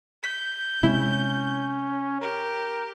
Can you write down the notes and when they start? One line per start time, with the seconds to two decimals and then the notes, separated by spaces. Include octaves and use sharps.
0.24 G6 B6
0.83 C3 G#3 C4 C#4 E4
2.21 G4 A#4